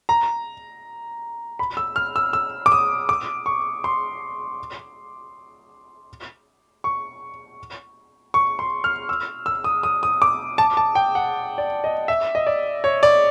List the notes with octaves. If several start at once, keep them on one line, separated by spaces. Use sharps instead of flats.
A#5
B5
E6
F6
E6
E6
D6
D#6
D6
C#6
C6
C#6
C#6
C6
F6
E6
E6
D#6
D#6
D#6
D6
A5
A5
G5
F#5
D5
D#5
E5
D#5
D5
C#5
D5